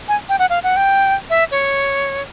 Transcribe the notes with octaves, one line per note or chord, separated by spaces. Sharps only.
G#5
G5
F#5
F5
F#5
G5
E5
C#5